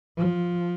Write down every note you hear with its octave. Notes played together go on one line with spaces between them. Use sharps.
F3